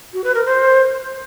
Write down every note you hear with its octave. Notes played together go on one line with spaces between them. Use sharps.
F#4
B4
A#4
C5